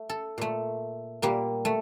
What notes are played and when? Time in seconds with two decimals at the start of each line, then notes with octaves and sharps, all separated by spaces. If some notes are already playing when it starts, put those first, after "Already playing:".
Already playing: A3
0.10 A4
0.38 A#2 A3
1.22 A#2 G3 A#3
1.65 A3